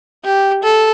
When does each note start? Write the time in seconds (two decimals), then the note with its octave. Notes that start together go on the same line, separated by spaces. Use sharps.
0.24 G4
0.63 A4